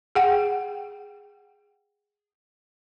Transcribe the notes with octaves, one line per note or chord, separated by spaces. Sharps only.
G#4 F#5 G5